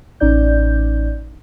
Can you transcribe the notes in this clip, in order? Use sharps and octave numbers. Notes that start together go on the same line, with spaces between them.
A1 C#4 D#4 D5 G6